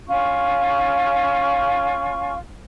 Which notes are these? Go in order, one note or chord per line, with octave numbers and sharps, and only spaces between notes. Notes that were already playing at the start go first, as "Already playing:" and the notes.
C#4 F4 C#6